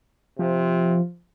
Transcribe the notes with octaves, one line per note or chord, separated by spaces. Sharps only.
C3 F3